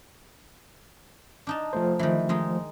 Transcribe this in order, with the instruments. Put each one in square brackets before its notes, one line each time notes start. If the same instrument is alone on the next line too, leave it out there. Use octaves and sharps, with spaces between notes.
[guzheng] D4 D#4 A5
[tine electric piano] F3 A3 C5
[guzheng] D#3 E3
D#3 G#3 D#4